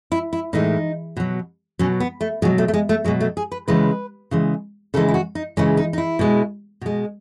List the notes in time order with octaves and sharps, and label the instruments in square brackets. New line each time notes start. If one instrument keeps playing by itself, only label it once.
[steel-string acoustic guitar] E4
E4
A2 E3 G#3 D#4
B2 F#3
B2 F#3 C#4
B3
A3
B2 F#3 G#3
A3
A3
G#3
A3
B2 F#3 G#3
A3
G#4
B4
C#3 E3 G#3 B4
C#3 E3 G#3
C#3 E3 G#3 A4
E4
F#4
D#4
C#3 E3 G#3 C#4
D#4
D#4
E4
B2 G#3
B2 G#3